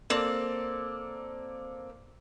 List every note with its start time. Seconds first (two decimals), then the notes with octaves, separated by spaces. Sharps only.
0.10 A#3 C4 A4 D5